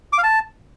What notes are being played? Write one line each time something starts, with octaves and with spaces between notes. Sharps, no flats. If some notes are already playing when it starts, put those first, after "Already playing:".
D6
F5
A5